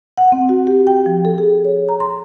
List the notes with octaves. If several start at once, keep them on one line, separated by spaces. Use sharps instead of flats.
F#5
C4
F#4
G4
G5
F3
A4
G#4
C#5
A#5
C6